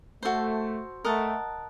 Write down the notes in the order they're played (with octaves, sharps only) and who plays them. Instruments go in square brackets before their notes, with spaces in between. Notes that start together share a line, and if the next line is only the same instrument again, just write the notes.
[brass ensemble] A3 [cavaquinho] F#4 A4 C5
[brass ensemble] A3 [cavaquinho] A#4 D#5 F#5 A5